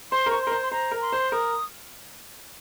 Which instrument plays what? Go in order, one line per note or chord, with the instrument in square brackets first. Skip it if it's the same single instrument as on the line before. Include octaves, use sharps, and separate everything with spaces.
[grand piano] C5 [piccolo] C6
[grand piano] A#4
[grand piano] C5 [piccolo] C#6
[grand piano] A#4 [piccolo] C6
[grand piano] C5
[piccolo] C6
[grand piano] C5 [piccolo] A#5
[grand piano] A#4
[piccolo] C6
[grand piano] C5
[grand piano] A#4 [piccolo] D#6